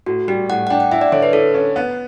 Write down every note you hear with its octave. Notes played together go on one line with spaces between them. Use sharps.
A2 F#4
G3 G4
A2 F#5
F#5
D4 G5
F#5
E4 E5
D5
D3 C#5
B4
E4 A4
C#4
B3